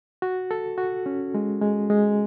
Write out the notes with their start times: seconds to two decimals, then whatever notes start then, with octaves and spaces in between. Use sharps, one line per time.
0.22 F#4
0.51 A4
0.78 F#4
1.06 C#4
1.34 G#3
1.61 G#3
1.90 G#3